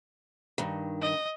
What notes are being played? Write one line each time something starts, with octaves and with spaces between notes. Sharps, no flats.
G2 D#3
D#5